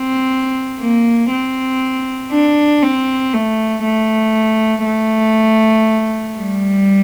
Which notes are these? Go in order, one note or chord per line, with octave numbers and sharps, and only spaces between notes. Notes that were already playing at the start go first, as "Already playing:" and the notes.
Already playing: C4
A#3
C4
D4
C4
A3
A3
A3
G3